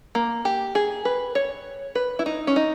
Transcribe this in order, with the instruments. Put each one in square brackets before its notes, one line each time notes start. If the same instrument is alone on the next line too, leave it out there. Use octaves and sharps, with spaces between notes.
[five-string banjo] A#3
G4
G#4
B4
C#5
B4
E4
D#4
C#4
D#4